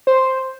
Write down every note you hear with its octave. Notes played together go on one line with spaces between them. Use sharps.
C5